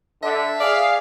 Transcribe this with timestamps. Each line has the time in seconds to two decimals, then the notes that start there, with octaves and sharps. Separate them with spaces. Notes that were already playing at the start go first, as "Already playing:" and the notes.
0.23 D3 E5
0.60 G#4 D5 F5